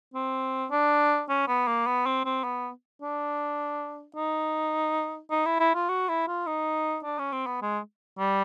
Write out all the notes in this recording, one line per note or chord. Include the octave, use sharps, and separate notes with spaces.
C4
D4
C#4
B3
A#3
B3
C4
C4
B3
D4
D#4
D#4
E4
E4
F4
F#4
E4
F4
D#4
D4
C#4
C4
B3
G#3
G3